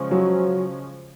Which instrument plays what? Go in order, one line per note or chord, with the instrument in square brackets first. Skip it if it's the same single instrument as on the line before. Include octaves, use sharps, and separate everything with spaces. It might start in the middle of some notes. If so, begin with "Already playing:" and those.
Already playing: [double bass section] C#3 F3 G#3 C#4
[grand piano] F#3